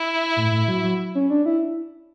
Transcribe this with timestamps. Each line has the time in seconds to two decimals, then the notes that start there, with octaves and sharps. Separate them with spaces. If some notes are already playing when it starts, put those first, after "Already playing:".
Already playing: E4
0.36 A2
0.52 A2
0.68 F#3
0.83 F#3
1.15 C#4
1.30 D4
1.46 E4